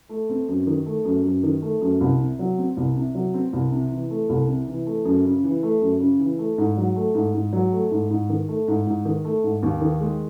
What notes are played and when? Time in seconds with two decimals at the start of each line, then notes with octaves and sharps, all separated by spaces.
0.09 A3
0.30 C4
0.48 F#2
0.67 D#3
0.86 A3
1.05 F#2
1.24 F#2
1.43 D#3
1.62 A3
1.81 F#2
2.01 C2
2.19 C3
2.39 F#3
2.58 C4
2.77 C2
2.96 C3
3.15 F#3
3.34 C4
3.53 C2
3.72 C3
3.91 E3
4.10 A3
4.29 C2
4.48 C3
4.67 E3
4.86 A3
5.05 F#2
5.25 C#3
5.44 E3
5.63 A3
5.81 F#2
6.00 C#3
6.19 E3
6.39 A3
6.58 G#2
6.77 F#3
6.96 A3
7.15 G#2
7.34 G#2
7.53 F#3
7.72 A3
7.91 G#2
8.10 G#2
8.29 D#3
8.48 A3
8.68 G#2
8.87 G#2
9.05 D#3
9.25 A3
9.44 G#2
9.63 D#2
9.81 D#3
10.00 G#3